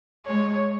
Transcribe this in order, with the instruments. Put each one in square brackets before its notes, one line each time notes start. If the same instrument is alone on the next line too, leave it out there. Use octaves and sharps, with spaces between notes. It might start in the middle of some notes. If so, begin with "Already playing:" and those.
[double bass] G#3 [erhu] C#5